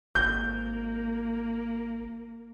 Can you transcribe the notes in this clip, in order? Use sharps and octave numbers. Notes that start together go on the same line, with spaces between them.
G#1 A#3 G6